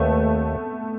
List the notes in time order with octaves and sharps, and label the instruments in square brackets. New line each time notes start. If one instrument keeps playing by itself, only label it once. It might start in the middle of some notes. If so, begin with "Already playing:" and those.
Already playing: [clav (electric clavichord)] D#2 [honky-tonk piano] A3 B3